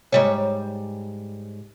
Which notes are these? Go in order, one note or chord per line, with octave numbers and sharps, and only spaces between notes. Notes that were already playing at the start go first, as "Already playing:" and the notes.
G#2 G3 C#5